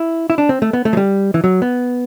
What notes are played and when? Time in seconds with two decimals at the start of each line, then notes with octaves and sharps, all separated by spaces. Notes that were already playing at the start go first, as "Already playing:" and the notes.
Already playing: E4
0.30 E4
0.38 D4
0.49 C4
0.62 A3
0.73 B3
0.85 A3
0.93 F#3
0.97 G3
1.34 E3
1.44 F#3
1.62 B3